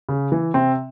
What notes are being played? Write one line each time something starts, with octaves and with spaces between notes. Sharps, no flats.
C#3
E3
C3 C4